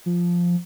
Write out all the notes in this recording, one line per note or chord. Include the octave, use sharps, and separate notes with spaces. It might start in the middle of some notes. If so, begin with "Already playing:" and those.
F3